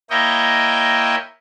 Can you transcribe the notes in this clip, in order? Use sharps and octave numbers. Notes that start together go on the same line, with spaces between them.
A#3 E4 C#5 D#5 G5